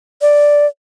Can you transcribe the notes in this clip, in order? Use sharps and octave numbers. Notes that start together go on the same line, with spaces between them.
D5